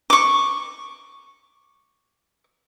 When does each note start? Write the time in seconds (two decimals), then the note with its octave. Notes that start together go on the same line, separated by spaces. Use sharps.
0.10 C#6 D6